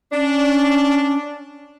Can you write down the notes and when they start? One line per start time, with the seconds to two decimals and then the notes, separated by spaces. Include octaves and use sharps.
0.12 C#4 D4